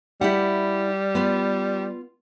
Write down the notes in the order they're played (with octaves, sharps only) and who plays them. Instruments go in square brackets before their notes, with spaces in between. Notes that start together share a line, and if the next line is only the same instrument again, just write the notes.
[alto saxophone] G3 [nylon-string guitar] E4 G4 F#5
[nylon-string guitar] B3 F4 B4